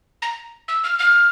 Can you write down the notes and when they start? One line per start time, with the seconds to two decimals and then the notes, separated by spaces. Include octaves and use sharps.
0.22 A#5
0.68 E6
0.84 F6
0.99 F6